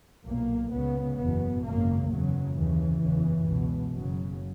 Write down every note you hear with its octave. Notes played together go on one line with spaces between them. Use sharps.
B1 A#2 A#3
C#2 C#3 B3
F#1 E2 B2 B3
G#1 F#2 C#3 A#3
F#1 E2 C#3 F#3
D#2 C#3 E3
F#1 E2 C#3
C#2 B2
F#1 F#2 C#3 F#3